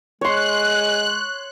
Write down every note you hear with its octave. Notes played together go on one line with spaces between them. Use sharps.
G#3 C#5 C6 F#6